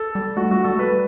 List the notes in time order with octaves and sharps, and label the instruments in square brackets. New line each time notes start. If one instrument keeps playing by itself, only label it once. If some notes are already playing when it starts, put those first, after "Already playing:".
Already playing: [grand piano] A4
[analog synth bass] G3
[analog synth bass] A3 [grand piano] F#4
[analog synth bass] G3 [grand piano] F#4
[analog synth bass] G3 [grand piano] A4
[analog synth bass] A3
[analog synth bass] G3 [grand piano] B4